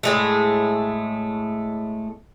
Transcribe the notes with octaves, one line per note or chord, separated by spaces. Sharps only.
A2 G#3 A3